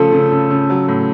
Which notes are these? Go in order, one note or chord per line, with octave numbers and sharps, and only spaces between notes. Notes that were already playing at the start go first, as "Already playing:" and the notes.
Already playing: C#3 F3 A3 A4
C#3
C#3
C#3
F#3
A2